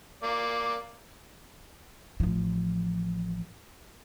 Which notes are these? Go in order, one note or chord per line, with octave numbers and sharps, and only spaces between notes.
A#3 D5
A1 F3